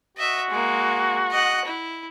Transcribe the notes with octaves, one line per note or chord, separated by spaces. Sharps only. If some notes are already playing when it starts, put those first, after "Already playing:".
F#4 D#5 E5
G#3 A#3
D#5 F#5
E4